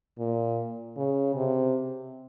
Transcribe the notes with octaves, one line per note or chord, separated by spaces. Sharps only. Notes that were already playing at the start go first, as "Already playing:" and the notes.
A#2
C#3
C3